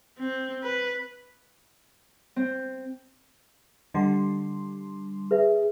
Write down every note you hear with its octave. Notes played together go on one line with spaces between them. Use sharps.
C4
B4
C4
D3 G3 D#5 F#5 C6
G#4 B4 E5